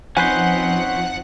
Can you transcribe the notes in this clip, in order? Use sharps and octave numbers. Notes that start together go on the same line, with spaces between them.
F3 C4 C#4 D#4 B4 C5 F#5